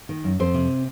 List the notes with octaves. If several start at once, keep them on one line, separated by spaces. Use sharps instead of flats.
D#3
F#2
F2 C4 C5
C3